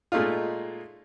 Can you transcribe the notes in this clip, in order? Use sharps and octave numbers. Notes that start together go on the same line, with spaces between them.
A#2 G#3 A3 D#4 F4